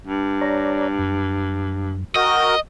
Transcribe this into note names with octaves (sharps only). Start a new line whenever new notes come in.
G2
C#5 D5 A#5
F#2
F#4 A#4 D#5 G5